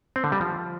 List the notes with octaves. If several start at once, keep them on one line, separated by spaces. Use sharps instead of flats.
C4
D3
G3
F3